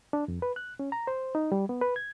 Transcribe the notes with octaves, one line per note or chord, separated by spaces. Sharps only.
D4
F2
B4
F#6
C#4
A#5
C5
D#4
G3
B3
B4
G#6